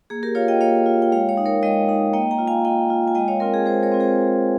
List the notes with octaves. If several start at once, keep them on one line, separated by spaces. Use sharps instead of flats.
A#3 G#4
G4 A#4
F4 C#5 F5
D#5 G5
A#3 C#5 F5
F4
G5
G#3 C#5 F5
C#5 F5
D#4
A#4 C#5
G#3 D#5 G5
D#4
A#3 D#5 G5
G5 A#5
F4
F5 G#5
A#3 D#5 G5
F4
G#5
G#3 D#5 G5
C#5 F5
C4 F4 A#4 C#5
G#4
G#3 G#4 C5
A#4 C#5
C4 F4
G#4 C5